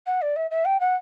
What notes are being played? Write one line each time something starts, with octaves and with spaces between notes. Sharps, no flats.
F#5
D5
E5
E5
G5
F#5